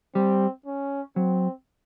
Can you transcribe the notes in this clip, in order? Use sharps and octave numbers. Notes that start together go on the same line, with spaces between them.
G3 C4
C#4
F#3 C4